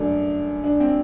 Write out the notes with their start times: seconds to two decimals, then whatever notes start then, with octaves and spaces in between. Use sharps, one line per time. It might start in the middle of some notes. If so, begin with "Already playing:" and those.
Already playing: F#2 F#3 A3 D4 A4 A#4
0.64 D4
0.80 C4